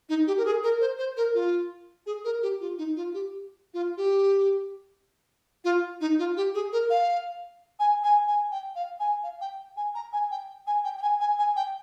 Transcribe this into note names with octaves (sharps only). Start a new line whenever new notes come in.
D#4
G4
A#4
G#4
A#4
C5
C5
A#4
F4
G#4
A#4
G4
F4
D#4
F4
G4
F4
G4
F4
D#4
F4
G4
G#4
A#4
F5
G#5
G#5
G#5
G5
F5
G#5
F5
G5
G#5
A#5
G#5
G5
G#5
G5
G5
G#5
G#5
G#5
G5